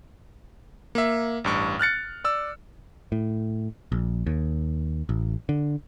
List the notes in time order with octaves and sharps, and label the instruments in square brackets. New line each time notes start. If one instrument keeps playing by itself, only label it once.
[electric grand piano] A#3 E5
A1 G2 C#6
F6 F#6 A6 C#7
D5 E6
[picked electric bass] A2
A#1
D#2
A1
D3